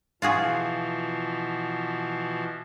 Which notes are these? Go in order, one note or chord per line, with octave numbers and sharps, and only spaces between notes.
B2 E3 F3 F4 F#4 G#4